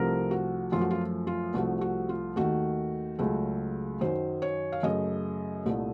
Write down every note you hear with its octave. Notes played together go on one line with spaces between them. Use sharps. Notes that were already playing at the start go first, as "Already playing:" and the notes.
Already playing: C2 C3 F3 A3 A#4
F#4
F#2 F3 A3 F4
F#4
F4
F4
C2 C3 F3 A3 F#4
F#4
F4
D#2 D#3 A3 F#4
C#2 C#3 F#3 A3
F#2 D#3 F#3 C5
C#5
F5
F#2 C#3 A3 D#5
C2 A#2 A3